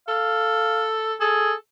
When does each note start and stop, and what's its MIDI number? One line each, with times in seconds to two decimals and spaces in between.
0.08 1.15 69
0.08 0.84 77
1.21 1.53 68
1.21 1.55 69